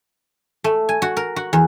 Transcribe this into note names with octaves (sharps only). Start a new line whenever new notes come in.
A3
G#5
F#4
A#4
F#4
E2